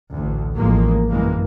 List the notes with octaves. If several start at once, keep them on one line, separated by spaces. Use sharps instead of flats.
A1 D2
A1 F3 G#3 A#3
F#1 G2 E3 G#3 A#3